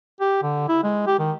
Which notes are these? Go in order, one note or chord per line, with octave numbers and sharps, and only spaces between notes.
G4
D3
E4
G#3
G4
D#3